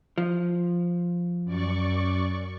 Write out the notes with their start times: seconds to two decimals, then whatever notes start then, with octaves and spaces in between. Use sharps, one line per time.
0.18 F3
1.44 F#2 D5 C#6